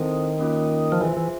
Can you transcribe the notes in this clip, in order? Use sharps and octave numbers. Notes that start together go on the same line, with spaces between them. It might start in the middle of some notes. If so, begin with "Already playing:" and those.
Already playing: D#3 C4 E4 A4 C5
A#3 C#4 F4
F3
E3 F4 G#4 C5 E5
E3